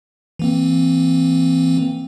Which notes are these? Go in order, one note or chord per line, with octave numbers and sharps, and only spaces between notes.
E3 A#3 C4